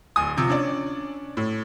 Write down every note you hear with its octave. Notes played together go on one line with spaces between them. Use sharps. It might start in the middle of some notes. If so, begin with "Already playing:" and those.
D1 G#5 D#6
C3 F3
C#4 D4 D5
A2